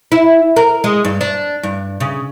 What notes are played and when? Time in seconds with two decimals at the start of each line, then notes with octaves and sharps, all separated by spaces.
0.12 E4
0.57 A#4
0.84 G#3
1.05 G2
1.21 D4
1.63 G2
2.00 C#3